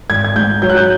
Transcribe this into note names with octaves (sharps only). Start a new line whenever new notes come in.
G#1 G#6
G#6
G#2 G6
F#3 G6
F#6
G6